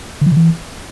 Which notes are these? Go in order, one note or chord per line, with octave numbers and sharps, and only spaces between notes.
D3
F3
C#3
E3